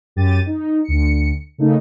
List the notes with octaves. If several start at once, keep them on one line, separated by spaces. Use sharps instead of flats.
F#2 G4 A6 D#7
D#4
D2 C#7
C#3 A3 A#3 D#4